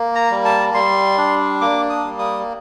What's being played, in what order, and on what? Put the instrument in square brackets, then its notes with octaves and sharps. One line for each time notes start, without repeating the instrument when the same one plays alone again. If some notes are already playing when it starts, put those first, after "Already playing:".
Already playing: [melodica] A#3
A#5
G3
A5
G3 C6
D4
A#3 D6
D#6
G3
D#6